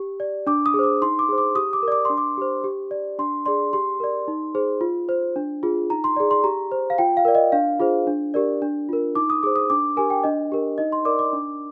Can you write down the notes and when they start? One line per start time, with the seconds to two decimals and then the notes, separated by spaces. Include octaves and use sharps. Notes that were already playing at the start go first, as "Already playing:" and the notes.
Already playing: G4
0.20 D5
0.47 D4 D6
0.66 D#6
0.74 G#4
0.79 C5 D6
1.02 D#4 C6
1.19 D6
1.29 G#4 C5
1.38 D6
1.55 G4 D#6
1.73 D6
1.83 A#4
1.88 D5 D6
2.05 D4 C6
2.18 D6
2.37 G4 C5
2.64 G4
2.91 D5
3.19 D4 C6
3.46 G#4 D5 C6
3.73 G4 C6
4.00 A#4 D5
4.28 D#4
4.55 G#4 C5
4.81 F4
5.09 C5
5.36 D4
5.63 F4 G#4
5.90 D#4 A#5
6.04 C6
6.16 G#4 D5
6.31 C6
6.44 G4 A#5
6.72 C5
6.90 F5
6.98 F4 G5
7.17 F5
7.25 A#4 D5
7.35 D#5
7.52 D4 F5
7.80 F4 G#4 C5
8.07 D4
8.34 G4 A#4 D5
8.62 D4
8.89 F4 A#4
9.15 D#4 D6
9.30 D#6
9.43 G#4 C5 D6
9.56 D#6
9.70 D4 D6
9.97 G4 A#4 G#5
10.10 G5
10.24 D4 D#5
10.52 G4 A#4
10.78 D#4 D#5
10.92 C6
11.05 A#4 D5 D6
11.19 D6
11.33 D4